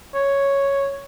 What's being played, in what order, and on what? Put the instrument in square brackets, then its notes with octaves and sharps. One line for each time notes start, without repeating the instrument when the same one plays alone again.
[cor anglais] C#5